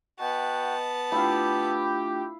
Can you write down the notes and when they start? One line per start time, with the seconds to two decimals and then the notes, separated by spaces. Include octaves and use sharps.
0.20 B3 F#4 D#5 F#5 G5 A5
1.12 A3 D4 E4 F4 G4 F5